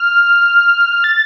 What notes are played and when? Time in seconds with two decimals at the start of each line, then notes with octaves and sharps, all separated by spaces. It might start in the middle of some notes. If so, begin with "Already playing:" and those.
Already playing: F6
1.04 A6